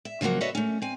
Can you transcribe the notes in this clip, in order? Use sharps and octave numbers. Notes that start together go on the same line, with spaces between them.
E5
C#3 F3 F#3 A#3 F#4
F#4 A4 B4 C#5 D#5 E5
A3 C#4
C4 G#5